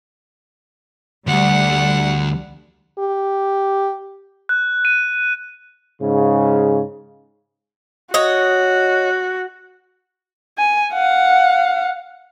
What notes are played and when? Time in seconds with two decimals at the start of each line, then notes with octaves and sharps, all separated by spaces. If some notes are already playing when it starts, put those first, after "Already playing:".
1.27 D2 G3 F#5
2.99 G4
4.49 F#6
4.85 D#7
6.00 G#2 C#3
8.14 F#4 C#5 D#5
10.58 G#5
10.93 F5 F#5